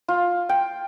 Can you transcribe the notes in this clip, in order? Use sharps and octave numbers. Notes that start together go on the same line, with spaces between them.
F4
G5